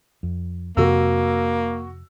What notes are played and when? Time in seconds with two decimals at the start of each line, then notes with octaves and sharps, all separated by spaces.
0.23 F2
0.77 F2 C3 A#3 C4 F#4 E6